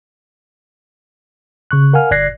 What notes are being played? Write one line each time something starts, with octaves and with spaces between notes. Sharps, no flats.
C#3 C#6 F#6
A#4 F5 F#5 G#5 F6
G1 D5 F#6 G#6 A#6 C7